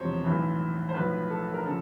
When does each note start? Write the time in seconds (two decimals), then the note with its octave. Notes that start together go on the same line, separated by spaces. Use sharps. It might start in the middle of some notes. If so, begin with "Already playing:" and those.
Already playing: E1 E2 C3 F3 C5 C#5
0.24 B1 A2 E3
0.89 C5
0.94 B1 A2 F3 B4
1.30 A4
1.54 A#4
1.65 C#3 F3 A4